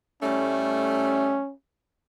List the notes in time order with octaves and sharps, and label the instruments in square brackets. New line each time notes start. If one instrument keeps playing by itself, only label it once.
[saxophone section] A2 G3 A3 [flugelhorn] C#4